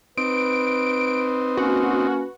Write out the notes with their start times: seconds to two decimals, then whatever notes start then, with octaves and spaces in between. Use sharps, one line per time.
0.18 C4 D#4 B4 D7
1.57 A#3 C#4 F#4